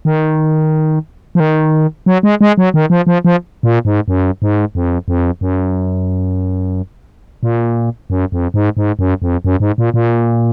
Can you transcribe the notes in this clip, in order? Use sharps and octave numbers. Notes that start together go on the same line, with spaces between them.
D#3
F3
D#3
F#3
G#3
G#3
F#3
D#3
F3
F3
F3
A#2
G#2
F#2
G#2
F2
F2
F#2
A#2
F#2
F2
G#2
G#2
F#2
F2
F#2
G#2
A#2
A#2